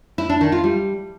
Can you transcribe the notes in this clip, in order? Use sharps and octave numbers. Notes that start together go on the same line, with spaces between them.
E4
D4
D#3
F4
G3